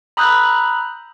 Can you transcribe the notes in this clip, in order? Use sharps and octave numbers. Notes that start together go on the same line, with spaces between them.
A#5 B5 D#6 E6 F#6 G6